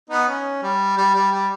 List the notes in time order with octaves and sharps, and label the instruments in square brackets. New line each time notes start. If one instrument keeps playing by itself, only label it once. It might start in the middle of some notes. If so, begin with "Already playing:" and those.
[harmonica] B3 D#4
C#4
G3
G3
G3
G3